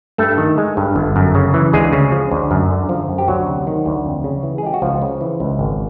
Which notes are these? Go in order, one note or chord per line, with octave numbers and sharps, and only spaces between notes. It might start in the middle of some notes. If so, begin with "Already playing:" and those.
G2 A3 A4
D#3
G#3
G2
G1
F#2
C#3
E3
D2 G#3 G#4
C#3
F3
D2
F#2
D3
F3
F#2
G4
D2 F#3 F#4
C3
D#3
D2
F2
C#3
E3
G#4
G#3 G4
F#4
C#2 F3 F4
C#3
E3
C#2
G#1